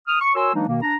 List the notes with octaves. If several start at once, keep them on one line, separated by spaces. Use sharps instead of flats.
D#6 F6
C#6
F#4 A#4 C#5 G#5 C6 E6
E3 F#3 G#3 A#3 D4 D#4
B2 D#3 A#3
D4 A#5